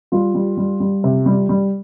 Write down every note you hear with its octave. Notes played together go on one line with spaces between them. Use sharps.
G3 F4
G3
G3
G3
C3
G3
G3